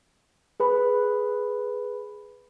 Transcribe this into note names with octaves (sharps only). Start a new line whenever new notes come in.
G#4 B4 B5